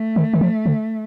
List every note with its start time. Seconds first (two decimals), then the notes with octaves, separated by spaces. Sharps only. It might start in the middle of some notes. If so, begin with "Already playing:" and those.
Already playing: A3
0.16 D#3
0.33 D#3
0.41 F3
0.66 D3